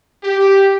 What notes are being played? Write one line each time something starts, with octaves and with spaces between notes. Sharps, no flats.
G4